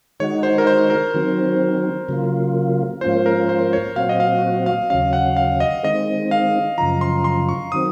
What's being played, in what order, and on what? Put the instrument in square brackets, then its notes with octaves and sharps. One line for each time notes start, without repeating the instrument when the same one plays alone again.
[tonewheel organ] D#3 G#3 D#4 F#4 [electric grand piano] C#5
[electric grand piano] C5
A#4
C5
A#4
[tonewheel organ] D#3 F#3 C4
C#3 F#3 A#3 F4
[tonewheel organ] G#2 F3 A#3 C#4 F4 [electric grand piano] C5
[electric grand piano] A#4
C5
C#5
[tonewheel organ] A#2 F#3 C4 F#4 [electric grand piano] F5
[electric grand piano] D#5
F5
F5
[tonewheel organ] D#2 C#3 F#3 C#4 [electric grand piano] F5
[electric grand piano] F#5
F5
D#5
[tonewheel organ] D#3 G#3 C4 [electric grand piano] D#5
[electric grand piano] F5
[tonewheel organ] F#2 C#3 F3 [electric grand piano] A#5
[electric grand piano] C6
C6
C#6
[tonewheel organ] D#3 F#3 C4 [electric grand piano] D#6